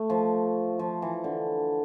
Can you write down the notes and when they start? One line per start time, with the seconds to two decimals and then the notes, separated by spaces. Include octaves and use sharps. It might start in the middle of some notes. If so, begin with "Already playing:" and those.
Already playing: A3
0.10 F3
0.79 F3
1.02 E3
1.24 D3